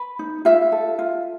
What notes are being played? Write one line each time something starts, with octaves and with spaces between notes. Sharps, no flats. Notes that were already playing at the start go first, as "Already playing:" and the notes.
Already playing: B4
D#4
F4 E5
A4
F4